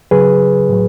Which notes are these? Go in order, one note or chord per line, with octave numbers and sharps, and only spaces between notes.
C#3 F#3 G#4 B4
A2 F#3